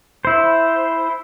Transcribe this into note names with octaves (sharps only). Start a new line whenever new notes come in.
E4 C5